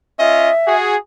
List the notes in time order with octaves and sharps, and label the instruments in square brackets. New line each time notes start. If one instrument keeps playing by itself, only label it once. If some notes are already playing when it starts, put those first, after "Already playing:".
[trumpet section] C#4 F4 D#5 [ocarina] E5
[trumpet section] F#4 G#4